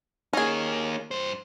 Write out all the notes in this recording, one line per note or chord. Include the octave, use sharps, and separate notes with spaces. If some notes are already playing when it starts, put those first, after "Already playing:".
A#3 C#4 D#4 G#4
G2 C5